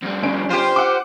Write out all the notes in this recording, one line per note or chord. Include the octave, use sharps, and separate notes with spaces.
F2 G3
G1 C#4 D7
F4 G4 C5
F#5 D6